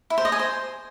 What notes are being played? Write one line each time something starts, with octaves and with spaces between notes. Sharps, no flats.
E4
C5
D#5
G#5
C5